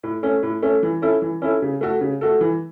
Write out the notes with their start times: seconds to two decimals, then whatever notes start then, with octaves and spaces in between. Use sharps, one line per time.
0.03 A2
0.23 A3 C#4
0.43 A2
0.62 A3 C#4
0.83 E3
1.02 C#4 E4 A4
1.22 E3
1.42 C#4 E4 A4
1.62 C#3
1.81 A3 F#4 A4
2.01 C#3
2.21 A3 F#4 A4
2.41 E3